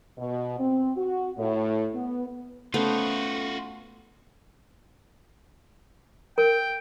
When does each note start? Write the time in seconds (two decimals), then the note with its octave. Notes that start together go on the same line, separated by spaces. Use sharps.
0.17 B2
0.59 C4
0.96 F#4
1.38 A2
1.94 B3
2.74 A3 B3 C#4 F4 F#4 A4 C5
6.38 A#4 G5